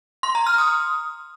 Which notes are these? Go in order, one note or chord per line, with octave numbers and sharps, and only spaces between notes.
C6
A#5
F6
D#6